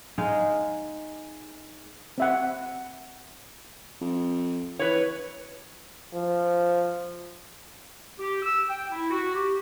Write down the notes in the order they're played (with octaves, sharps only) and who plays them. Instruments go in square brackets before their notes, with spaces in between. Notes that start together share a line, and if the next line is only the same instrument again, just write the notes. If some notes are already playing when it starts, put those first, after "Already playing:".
[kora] G#3 D#4 G#4 F5
[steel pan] C4 E5 F#5
[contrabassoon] F2
[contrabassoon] E3 [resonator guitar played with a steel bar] B4 C#5
[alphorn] F3
[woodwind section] G4
E6
G5
E4
F#4
G4